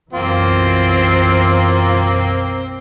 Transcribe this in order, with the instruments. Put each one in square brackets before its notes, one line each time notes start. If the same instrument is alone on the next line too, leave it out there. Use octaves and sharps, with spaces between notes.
[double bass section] B1 F#2 E3 [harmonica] A#3 C4 [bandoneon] F4